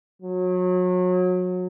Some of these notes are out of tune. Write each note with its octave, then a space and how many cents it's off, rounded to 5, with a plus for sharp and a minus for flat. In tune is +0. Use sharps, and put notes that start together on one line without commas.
F#3 -30